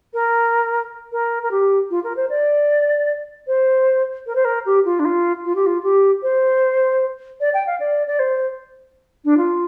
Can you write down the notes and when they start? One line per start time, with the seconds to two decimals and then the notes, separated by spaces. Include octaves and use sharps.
0.14 A#4
1.12 A#4
1.43 A#4
1.51 G4
1.90 F4
2.04 A#4
2.16 C5
2.30 D5
3.47 C5
4.26 A#4
4.35 C5
4.45 A#4
4.66 G4
4.85 F4
4.99 D4
5.05 F4
5.45 F4
5.55 G4
5.66 F4
5.83 G4
6.23 C5
7.40 D5
7.54 G5
7.67 F5
7.80 D5
8.07 D5
8.19 C5
9.25 D4
9.37 F4